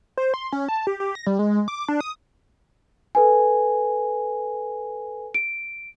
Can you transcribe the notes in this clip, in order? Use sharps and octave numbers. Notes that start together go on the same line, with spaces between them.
C5
C6
C#4
A5
G4
G4
A#6
G3
G#3
D6
D4
D#6
A4 B4 G#5
D7